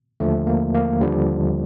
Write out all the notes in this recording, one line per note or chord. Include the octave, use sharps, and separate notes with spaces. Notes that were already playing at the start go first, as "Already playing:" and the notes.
D#2 D3 F3 A3
A#3
A#3
D#2 D3 F3 G3